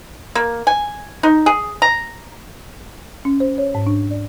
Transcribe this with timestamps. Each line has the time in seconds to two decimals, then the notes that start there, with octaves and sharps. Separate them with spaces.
0.35 A#3
0.67 G#5
1.23 D#4
1.46 G#4
1.82 A#5
3.25 C#4
3.40 C5
3.58 C#5
3.75 G#2
3.87 D4
4.11 D5